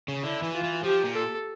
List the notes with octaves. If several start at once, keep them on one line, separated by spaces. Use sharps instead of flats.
C#3
D3 E4
E3
F4
E3
F3 G4
A#2
A4